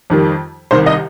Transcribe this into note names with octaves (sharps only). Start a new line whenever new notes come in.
F2 D#3 G3
C2 C3 D#3 G3 C5
D#5